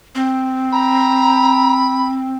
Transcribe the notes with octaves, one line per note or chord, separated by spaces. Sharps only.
C4
A#5 B5